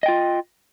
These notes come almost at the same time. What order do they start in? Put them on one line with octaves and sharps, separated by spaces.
D#5 G5 F4